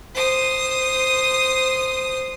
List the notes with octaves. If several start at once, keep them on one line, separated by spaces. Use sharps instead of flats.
C5 D#6